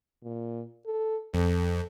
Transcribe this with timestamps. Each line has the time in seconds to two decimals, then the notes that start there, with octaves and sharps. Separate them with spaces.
0.23 A#2
0.86 A4
1.34 F2 A4